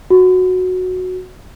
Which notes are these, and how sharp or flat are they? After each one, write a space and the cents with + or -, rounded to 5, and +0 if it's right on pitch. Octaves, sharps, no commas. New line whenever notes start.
F#4 -10